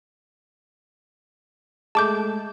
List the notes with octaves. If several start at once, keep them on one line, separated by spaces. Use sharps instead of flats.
G#3 A3 A5 D6 G6